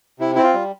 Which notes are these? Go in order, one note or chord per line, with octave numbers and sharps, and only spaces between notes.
C3 E4
C4 E4
F4
G3